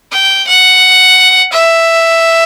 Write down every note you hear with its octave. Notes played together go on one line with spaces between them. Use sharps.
G5
F#5
E5